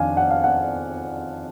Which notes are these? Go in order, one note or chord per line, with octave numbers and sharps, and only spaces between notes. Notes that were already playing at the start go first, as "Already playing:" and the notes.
Already playing: F2 D#3 D4 F5 G#5
F#5
F5
F#5